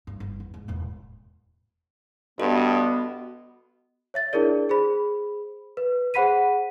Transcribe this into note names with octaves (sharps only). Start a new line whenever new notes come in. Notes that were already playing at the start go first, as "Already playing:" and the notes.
G2
G1
E2
G#2
E1 A1
G2 B3 F#4 A4 D#5
C#5 E5 A6
D4 E4 G#4 A#4 D5
G#4 C5 B5
B4
G#4 C5 F#5 B5 B6 D#7